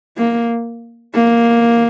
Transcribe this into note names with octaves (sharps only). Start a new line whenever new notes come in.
A#3
A#3